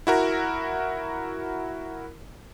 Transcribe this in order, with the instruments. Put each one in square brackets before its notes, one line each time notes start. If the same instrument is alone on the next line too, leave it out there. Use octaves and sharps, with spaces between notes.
[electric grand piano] E4 F#4 A#4